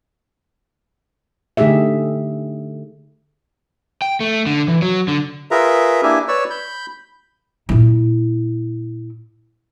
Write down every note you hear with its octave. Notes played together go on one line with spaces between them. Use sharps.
D3 A3 D#4 G4 G#4 E5
G5
A3
D3
E3
F#3
D3
F4 G#4 A#4 B4 E5 A#5
A#3 D4 E4 G4 E5 G#5
B4 C#5 D5 C#6 E6
B5 G6
A#2 E4